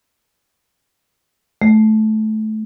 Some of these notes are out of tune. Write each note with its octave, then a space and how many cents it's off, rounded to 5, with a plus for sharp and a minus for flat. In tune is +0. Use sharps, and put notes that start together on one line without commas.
A3 -20